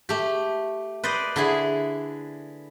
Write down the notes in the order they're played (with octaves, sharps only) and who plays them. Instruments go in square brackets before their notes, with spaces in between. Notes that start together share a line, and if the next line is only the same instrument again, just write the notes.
[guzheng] A3 G4
B4 C5 D5 D#5
D3 E4 G#4